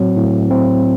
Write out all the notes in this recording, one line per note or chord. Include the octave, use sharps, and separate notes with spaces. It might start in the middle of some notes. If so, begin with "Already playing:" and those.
Already playing: A2 F#3 C4
A2
C4